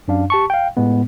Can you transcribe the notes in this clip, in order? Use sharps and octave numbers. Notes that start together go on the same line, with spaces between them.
F#2 D4 F5
G4 A5 C#6
F5 G5
A2 G#3 B3